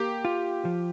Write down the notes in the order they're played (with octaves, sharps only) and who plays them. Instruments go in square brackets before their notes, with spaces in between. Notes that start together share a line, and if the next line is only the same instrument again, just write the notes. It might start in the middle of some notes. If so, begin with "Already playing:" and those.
Already playing: [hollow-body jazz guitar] A#3 [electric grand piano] G4
[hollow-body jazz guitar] F4
F3